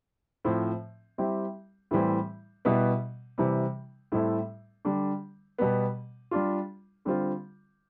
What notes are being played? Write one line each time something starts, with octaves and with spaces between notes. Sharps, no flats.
A2 F3 C4
G3 C4 E4 G4
A2 E3 G3 C4
B2 G3 B3 E4
C3 E3 G3
A2 G3 C4 E4 A4
D3 G3 D4
B2 G3 B3
G3 D4 F4
D3 G3 C4 F4